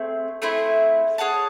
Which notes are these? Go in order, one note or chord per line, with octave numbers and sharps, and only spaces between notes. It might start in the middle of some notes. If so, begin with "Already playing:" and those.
Already playing: A3 C4 G#4
A3 C4 E4 G#4
G#4 C#5 F#5 A5